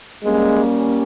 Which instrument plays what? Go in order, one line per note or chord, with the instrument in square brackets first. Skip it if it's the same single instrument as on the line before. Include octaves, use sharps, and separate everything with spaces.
[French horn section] G3 A#3 C#4 [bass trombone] G#3